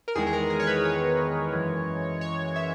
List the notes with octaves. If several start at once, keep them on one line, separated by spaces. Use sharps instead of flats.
A#4
E2 D#3 G#3 G#4
G#4
A#4
G#4
C#5
B4
C#5
F#2 E3 G#3
C#5
E5